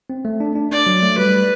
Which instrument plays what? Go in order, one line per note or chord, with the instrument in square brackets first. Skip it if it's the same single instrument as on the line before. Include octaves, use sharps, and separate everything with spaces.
[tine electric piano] C4
A3
D4
D4
[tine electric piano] D4 [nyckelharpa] D5
[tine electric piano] F#3
A3
[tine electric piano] G3 [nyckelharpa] B4